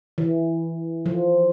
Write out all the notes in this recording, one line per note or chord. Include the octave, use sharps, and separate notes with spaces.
E3
F3